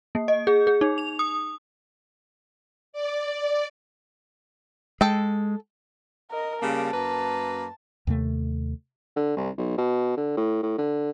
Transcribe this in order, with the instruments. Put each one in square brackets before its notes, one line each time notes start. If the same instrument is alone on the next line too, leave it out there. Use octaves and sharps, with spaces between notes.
[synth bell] A#3
D#5
G#4
G#4
D#4
F7
D#6
[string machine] D5
[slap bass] G#3 [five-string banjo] A4 G5
[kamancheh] A#4 D#5
[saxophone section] C#3 G3 A#3 [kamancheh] A5
[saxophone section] F#2 A#3 B4
[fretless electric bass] D#2 C3 A3
[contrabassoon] D3
C2
B1
B2
D3
A2
A2
D3